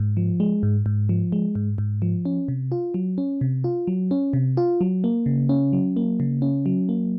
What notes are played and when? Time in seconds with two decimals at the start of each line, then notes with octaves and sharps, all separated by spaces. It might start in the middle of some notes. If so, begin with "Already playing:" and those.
Already playing: G#2
0.17 F3
0.40 G#3
0.63 G#2
0.86 G#2
1.09 F3
1.32 G#3
1.55 G#2
1.78 G#2
2.02 F3
2.25 C#4
2.48 C3
2.72 F4
2.94 F#3
3.18 C#4
3.41 C3
3.64 F4
3.87 F#3
4.11 C#4
4.33 C3
4.57 F4
4.81 F#3
5.04 A#3
5.26 C#3
5.49 C#4
5.73 F#3
5.97 A#3
6.20 C#3
6.42 C#4
6.66 F#3
6.89 A#3